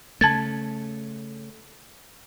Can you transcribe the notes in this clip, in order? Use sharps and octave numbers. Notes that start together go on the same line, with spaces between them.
C#3 A3 A5 G#6 A6